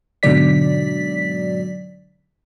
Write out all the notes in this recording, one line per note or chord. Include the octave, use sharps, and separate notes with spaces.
G#2 B2 D3 F#3 D5 B6